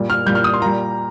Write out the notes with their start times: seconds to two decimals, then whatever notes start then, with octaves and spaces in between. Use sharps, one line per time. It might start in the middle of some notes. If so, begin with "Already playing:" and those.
Already playing: A#2 G3
0.10 F6
0.27 A#2 G3 G6
0.35 F6
0.44 D#6
0.54 C6
0.62 A#2 G3 A#5